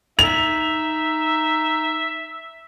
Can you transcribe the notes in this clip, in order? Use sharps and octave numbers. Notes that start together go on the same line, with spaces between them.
D#4 E5 F7